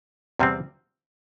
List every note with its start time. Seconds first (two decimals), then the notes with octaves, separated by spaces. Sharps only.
0.39 E2 C3 G3 C4